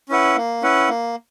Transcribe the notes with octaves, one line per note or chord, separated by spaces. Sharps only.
C#4 E4 B4 F#5
A#3
C#4 E4 B4 F#5
A#3